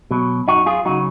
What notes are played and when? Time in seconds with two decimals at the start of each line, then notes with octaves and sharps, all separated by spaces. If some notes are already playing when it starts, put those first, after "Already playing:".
0.11 B2 F#3
0.48 F#2 D#4 F#4
0.66 F4 G#4
0.85 C#3 F#3 D#4 F#4